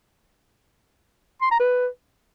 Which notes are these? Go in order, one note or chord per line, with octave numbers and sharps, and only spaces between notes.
C6
A#5
B4